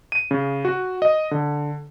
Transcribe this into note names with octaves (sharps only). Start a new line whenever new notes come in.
D#7
C#3
F#4
D#5
D3